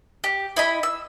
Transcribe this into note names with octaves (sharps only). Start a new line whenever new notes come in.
G4
E4 D#5 B5
E6